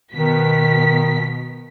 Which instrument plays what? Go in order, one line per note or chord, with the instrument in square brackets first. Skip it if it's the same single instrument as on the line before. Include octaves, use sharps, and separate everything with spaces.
[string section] B2 B6 [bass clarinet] D#3